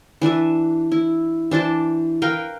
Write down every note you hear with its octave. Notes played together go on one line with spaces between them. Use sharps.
E3 D4 B4 E5
E4
E3 D4 C5 A5
A#4 B4 F5 G5